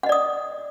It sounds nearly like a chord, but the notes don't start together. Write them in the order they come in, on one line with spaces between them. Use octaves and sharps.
F#5 D#5 D5 D#6